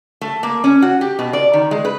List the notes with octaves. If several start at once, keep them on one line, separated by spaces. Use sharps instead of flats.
A3
A#3
C#4
F#4
G4
B2
D5
D#3
G#3
B4